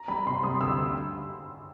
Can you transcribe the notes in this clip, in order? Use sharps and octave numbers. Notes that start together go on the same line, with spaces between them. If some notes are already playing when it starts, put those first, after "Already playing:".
Already playing: A#5
G3 B5
C3 C6
G3 D#6
D2 E6